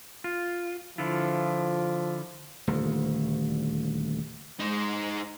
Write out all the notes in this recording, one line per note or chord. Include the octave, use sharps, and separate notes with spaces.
F4
D3 F3 E4 F4
D#1 D2
G#3 D#4 C5